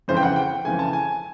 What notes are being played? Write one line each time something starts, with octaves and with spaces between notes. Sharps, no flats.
F2 C#3 E3 C5
G5
F#5
G5
F2 C#3 E3 G#5
A5
G#5